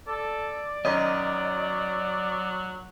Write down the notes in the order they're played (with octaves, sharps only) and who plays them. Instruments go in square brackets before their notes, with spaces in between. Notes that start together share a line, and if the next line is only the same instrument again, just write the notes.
[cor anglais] A4 [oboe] D5
[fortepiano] F#2 D#3 C#4 [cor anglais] F#3 [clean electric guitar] D#5